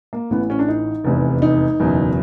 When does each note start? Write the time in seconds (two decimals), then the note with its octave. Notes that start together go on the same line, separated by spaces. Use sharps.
0.13 A#3
0.30 A1 A2 E3 B3
0.50 C#4
0.59 D4
0.68 D#4
1.04 F1 E2 C3
1.42 D#4
1.80 F#1 E2 B2